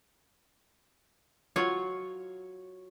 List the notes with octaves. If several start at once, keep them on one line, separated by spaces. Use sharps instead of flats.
F#3 F4 C#5